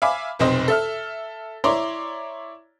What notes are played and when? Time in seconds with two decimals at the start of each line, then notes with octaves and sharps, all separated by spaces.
0.02 E5 F5 G#5 B5 D6
0.39 F1 B1 C4 C5 D#5
0.68 A4 E5 F6
1.64 E4 C#5 D5 A#5 C6 D6